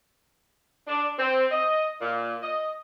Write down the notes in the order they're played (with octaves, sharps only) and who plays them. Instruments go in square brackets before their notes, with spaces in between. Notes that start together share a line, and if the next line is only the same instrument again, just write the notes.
[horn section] D4
C4
D#5
A#2
D#5